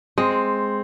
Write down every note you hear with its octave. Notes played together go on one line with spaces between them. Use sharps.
G#3 C4